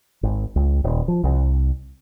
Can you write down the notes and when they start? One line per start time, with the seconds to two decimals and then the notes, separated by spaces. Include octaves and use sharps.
0.23 G#1
0.56 C#2
0.84 D#1
1.08 F3
1.24 C2